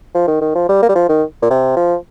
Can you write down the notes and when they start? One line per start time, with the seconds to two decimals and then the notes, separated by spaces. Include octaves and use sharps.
0.15 F3
0.28 D#3
0.41 D#3
0.55 F3
0.69 G3
0.83 A#3
0.89 G3
0.95 F3
1.09 D#3
1.42 A#2
1.50 C3
1.77 F3